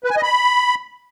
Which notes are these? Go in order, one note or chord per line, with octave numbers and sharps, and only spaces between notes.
B4
G#5
D#5
B5